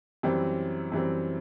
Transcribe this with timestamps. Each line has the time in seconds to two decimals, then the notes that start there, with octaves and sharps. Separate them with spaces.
0.23 F#2 E3 G3 C4
0.92 F#2 E3 G3 C4